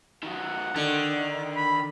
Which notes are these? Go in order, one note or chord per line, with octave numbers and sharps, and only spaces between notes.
D#3 F#3 F#5
D3 D#3
B5